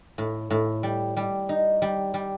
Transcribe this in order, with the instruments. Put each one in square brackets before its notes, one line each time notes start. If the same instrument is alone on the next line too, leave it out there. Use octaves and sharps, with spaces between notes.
[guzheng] A2
A2
G3
G3
D#4
G3
G3